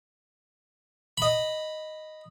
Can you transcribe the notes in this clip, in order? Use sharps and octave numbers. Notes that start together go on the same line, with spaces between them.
D#5 B5